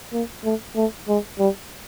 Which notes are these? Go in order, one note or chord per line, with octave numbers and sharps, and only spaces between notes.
A#3
A3
A3
G#3
G3